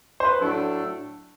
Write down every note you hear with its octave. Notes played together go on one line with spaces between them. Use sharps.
C5
B4
A2 F#3 A3 D4 A4